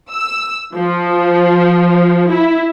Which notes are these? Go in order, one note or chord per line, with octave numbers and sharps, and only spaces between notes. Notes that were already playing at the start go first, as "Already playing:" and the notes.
E6
F3
E4